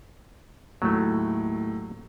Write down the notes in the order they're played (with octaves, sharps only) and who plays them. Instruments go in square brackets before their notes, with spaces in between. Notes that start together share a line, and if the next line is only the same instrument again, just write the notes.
[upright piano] D#2 A2 [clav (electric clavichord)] F#3 A3